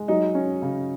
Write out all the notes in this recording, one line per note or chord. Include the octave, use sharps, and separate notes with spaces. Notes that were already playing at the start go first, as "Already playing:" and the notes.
Already playing: G#3
F#3 D#4
C#4
C#3